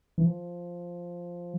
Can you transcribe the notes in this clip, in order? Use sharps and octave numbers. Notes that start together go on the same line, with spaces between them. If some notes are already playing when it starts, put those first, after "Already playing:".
E3
F3